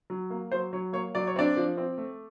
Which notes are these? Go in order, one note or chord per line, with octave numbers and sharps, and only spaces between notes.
F#3
A#3
F#3 C5
F#3 C#5
A#3 C#5
F#3 D5
C#5
C4 D4 D5
F3
C4
A3